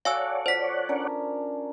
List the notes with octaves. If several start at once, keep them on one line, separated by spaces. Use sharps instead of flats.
F#4 A4 C#5 D5 F5 F#5 G#5 E6
F3 C5 C#6 B6
C#4 D4 A#4